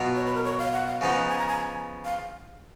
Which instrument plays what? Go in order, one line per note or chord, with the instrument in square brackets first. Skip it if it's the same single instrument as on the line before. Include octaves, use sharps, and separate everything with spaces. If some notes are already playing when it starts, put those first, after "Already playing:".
Already playing: [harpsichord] B2 F#3 B3 F4
[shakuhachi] C#5
B4
A#4
C#5
F5
F#5
F5
[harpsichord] C#3 F3 B3 D#4 [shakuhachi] F#5
[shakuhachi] G#5
A#5
G#5
F5